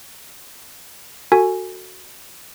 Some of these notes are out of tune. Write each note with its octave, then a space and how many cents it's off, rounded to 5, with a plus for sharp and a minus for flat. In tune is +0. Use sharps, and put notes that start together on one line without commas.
F#4 +0 A4 +30 G#5 +0